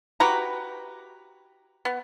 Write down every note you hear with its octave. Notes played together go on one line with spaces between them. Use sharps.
F#4 G4 B4 A#5
B3